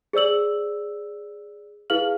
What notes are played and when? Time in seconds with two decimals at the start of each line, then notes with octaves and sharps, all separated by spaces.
0.13 G#4 C5 D5 E6 F#7
1.90 E4 G#4 B4 F5 F6 F#7